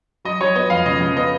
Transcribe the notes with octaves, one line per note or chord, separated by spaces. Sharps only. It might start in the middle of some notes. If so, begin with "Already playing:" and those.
F#3 D#5
F#3 C#5
B3 D#5
F2 F5
C#3 D#5
C#3
B3 D#5